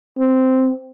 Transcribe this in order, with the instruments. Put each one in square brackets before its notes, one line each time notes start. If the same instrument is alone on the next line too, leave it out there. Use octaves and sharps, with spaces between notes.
[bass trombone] C4